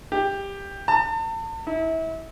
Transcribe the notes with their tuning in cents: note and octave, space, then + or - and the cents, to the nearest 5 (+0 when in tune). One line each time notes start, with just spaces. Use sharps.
G4 +15
A5 +40
E4 -30